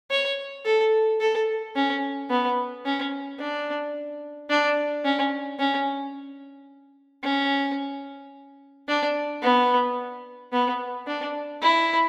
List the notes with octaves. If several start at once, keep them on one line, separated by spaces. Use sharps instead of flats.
C#5
A4
A4
C#4
B3
C#4
D4
D4
C#4
C#4
C#4
D4
B3
B3
D4
E4